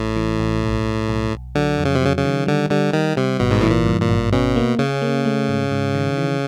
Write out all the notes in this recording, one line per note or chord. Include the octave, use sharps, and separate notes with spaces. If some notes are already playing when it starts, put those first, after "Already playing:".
Already playing: A1 A2
E3
A1
B1
B1
B1
B1
D3 F#3
F2
C#3
C3
C#3 F#3
C#3
D#3
D3 G3
D3 G3
D#3 G3
C3 G3
G#1 B2
G#2
A2 E3
A#2
G2
A#2
G#1
B2 C#4
A#3
C#3 C#4
A#3
A3
G#2
G#2
D#3
E3